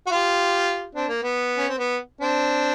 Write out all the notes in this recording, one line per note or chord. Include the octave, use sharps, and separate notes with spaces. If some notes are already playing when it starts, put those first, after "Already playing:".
F#4
F4 G4
C4 D4
A#3
B3
C#4
C4
B3
C4 D4